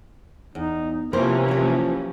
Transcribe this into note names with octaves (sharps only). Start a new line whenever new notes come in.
E2 D#4
C3 E3 F3 A#3 C4 C#4 A#4 C5
F3 F#3 G4